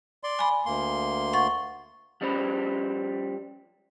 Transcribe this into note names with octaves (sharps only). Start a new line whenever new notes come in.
D5 C6
G#5 B5
D2 A#3 C6
F#5 C#6 A6
F3 G3 C#4 C5 B5